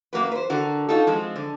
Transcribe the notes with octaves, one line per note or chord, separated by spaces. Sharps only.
F#2 A#3 F#4 B4
B4 C5
D3 F#4 A#4
D#4 F4 F#4 A4
F3 G#3 C4
D3